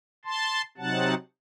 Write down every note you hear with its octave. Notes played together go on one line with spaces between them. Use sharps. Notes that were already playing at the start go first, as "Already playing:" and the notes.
A5 C6
C3 F#3 C4 D#4 F#5 A5